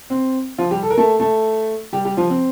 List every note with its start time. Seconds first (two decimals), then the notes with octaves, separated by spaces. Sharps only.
0.10 C4
0.58 F3 F4
0.71 G3 G4
0.83 A4
0.90 A#4
0.98 A3 A4
1.20 A3 A4
1.93 G3 G4
2.05 G3 G4
2.17 F3 F4
2.30 C4